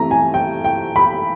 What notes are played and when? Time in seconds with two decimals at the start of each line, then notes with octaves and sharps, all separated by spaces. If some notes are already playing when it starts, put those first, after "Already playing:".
Already playing: E3 A3 C4 A#5
0.11 G#5
0.34 G5
0.64 G5
0.96 B5